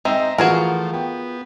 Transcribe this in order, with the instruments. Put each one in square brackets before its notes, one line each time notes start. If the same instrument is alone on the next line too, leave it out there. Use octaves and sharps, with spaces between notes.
[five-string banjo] G#3 D#4 [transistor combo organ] C4 A#5 [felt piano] E5 G5 E6
[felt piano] E3 [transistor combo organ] F3 A3 [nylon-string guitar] F4 [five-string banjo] F#4 G#4 A#4
[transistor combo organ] B3 [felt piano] G5